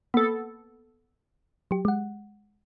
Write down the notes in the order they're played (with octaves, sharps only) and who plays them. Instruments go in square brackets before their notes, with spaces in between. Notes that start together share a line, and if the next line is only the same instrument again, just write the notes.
[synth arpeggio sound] A#3 [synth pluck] B3 A4
[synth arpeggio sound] F#3 G4
G#3 F#5